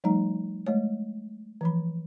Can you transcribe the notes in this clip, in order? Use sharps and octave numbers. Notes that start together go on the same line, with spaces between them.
F3 G3 A3 D#4 A#5
G#3 A3 C#5
E3 F3 B5